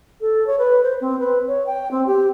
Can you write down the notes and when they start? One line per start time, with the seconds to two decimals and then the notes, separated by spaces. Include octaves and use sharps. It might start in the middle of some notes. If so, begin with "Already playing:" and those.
0.21 A4
0.47 C#5
0.58 B4
0.83 C5
1.01 C4
1.19 B4
1.47 C#5
1.66 G5
1.91 C4
2.06 G4